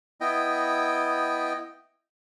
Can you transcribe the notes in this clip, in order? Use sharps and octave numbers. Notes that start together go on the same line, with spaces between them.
B3 E4 D#5 G5